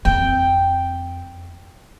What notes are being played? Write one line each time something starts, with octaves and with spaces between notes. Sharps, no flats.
F2 C4 G5